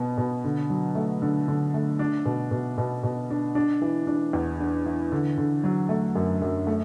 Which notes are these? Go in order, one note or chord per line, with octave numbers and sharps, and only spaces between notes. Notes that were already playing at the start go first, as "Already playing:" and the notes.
Already playing: B2 B3
B2
D3
F#3
A3
D3
D3
A3
D4
B2
B2
B2
B2
D4
D4
E3
D4
E2
D4
E3
D3
D3
F#3
A3
F#2
F#2
A3